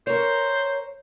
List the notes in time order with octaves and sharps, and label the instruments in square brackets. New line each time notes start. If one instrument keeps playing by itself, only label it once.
[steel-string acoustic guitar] A#4 C#5 [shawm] C5